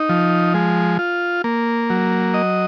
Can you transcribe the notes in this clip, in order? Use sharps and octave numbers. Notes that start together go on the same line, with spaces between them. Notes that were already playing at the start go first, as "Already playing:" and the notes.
Already playing: D#4
F3
G#3
F4
A#3
F#3
D#5